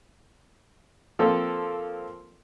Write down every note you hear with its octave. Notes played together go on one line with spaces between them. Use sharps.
F3 A#3 C4 A4